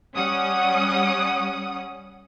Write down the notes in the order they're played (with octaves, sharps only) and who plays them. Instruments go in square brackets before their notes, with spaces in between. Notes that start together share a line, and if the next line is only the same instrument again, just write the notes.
[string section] G3 C#4 F#5 D#6